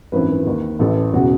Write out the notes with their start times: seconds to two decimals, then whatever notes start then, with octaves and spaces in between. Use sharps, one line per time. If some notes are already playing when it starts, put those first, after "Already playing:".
0.12 G#1 F#2 E3 B4
0.47 D#2 D#3
0.79 A1 A2 E3 A4
1.13 E1 C#3 F#4